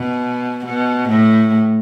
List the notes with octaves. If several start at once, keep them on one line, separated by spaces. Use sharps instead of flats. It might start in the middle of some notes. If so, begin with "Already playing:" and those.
Already playing: B2
B2
A2